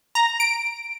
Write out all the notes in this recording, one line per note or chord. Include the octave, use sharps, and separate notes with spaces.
A#5
D7